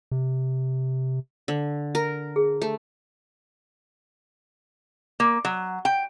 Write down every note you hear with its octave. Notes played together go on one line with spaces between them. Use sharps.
C3
D3
A#4
G#4
A3
A#3
F#3
G5